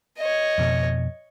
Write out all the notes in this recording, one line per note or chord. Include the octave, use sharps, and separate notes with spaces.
C#5 D#5
F2 B2